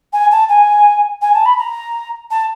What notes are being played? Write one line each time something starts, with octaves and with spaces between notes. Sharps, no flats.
G#5
A5
G#5
G#5
A5
B5
A#5
A5